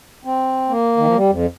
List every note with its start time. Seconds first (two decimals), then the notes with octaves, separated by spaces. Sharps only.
0.25 C4
0.69 A#3
0.97 D#3
1.06 F3
1.15 G3
1.30 F2